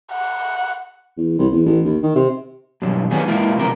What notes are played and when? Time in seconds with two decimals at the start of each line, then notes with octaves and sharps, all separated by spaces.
0.13 F#5
1.18 E2
1.38 C2
1.52 E2
1.66 A1
1.85 D#2
2.03 D#3
2.15 C3
2.82 G2 B2 F#3
3.11 D#3 F#3 G3 B3 C#4 G#4
3.27 G#3 A#3 E4 F4 A#4
3.56 B1 C3 D#3 F3 G#3 A#4